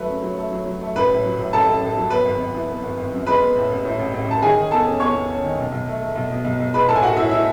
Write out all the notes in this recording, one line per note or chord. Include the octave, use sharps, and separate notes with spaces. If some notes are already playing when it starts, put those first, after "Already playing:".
Already playing: F#3 A3 B4
C#3
F#3
A3
F#3
F#3
A3
A1 B4 B5
A2
F#3
A2
A1 A4 A5
A1
A1
F#3
B3 B4 B5
G#1
G#1
E3
B3
G#1
G#1
F#2
G#3 B4 B5
B3
A2
A1
A2
A1
A1
A1 A5
D#3 G#4 G#5
D#3
E2 A4 A5
C#4
E2 C#5 C#6
E2
C#4
D#3
B1
B1
A3
A3
B1
B2
B1
B1
G#3 B4 B5
A2 A4 A5
G#5
A2 F#4 F#5
A2 E4 E5
E4 E5